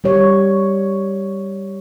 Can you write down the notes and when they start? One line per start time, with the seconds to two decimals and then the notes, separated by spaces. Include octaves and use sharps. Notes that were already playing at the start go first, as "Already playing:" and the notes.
0.04 G3 G4 C#5